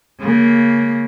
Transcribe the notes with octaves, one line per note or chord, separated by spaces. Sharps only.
C#3 A#3